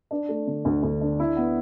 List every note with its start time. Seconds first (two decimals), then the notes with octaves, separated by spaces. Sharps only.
0.11 D4
0.29 A3
0.47 D3
0.65 D2
0.83 D2
1.01 D4
1.20 E4
1.37 B3